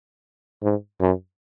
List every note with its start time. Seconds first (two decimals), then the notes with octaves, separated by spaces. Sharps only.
0.63 G#2
1.00 F#2